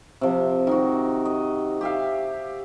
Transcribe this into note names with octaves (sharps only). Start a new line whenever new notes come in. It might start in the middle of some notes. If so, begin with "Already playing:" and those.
C3 F3
D#3 D#4 F#4
D#5
G4 E5 F5